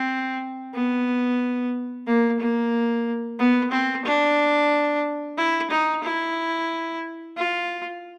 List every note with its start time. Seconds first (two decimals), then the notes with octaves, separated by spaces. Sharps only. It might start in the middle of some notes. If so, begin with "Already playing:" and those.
Already playing: C4
0.74 B3
2.07 A#3
2.40 A#3
3.39 B3
3.72 C4
4.05 D4
5.37 E4
5.71 D#4
6.04 E4
7.37 F4